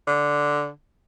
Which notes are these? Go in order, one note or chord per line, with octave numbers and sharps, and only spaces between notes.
D3